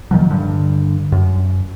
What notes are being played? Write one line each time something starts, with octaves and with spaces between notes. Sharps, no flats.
A#2 D#3 F3 F#3
G2 D3
F#2